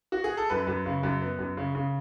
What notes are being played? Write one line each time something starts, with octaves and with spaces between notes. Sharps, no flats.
F#4
G#4
A4
F#2 B4
F#2
C#3
F#2
B3
F#2
C#3
C#3